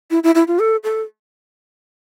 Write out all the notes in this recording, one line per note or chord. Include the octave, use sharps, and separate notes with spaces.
E4
E4
E4
F4
A4
A4